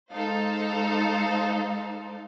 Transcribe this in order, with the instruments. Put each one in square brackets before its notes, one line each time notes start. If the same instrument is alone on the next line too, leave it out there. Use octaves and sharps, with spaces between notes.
[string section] G#3 D#4 A4 C5 F5